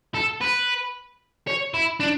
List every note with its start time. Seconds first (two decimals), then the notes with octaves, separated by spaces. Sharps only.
0.14 A4
0.41 B4
1.47 C#5
1.74 E4
2.00 D4